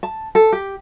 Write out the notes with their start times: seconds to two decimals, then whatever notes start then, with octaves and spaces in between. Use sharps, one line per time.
0.03 A5
0.35 A4
0.53 G4